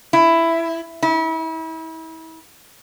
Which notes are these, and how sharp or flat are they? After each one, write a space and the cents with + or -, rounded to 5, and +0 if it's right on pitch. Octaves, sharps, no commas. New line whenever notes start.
E4 +10
E4 -35